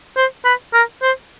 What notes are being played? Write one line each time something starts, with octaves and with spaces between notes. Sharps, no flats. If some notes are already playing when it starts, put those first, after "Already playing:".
C5
B4
A#4
C5